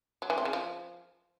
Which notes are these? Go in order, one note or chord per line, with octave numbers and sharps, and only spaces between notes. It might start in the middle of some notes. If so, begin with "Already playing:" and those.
F#3
E3
C4
C#3
F3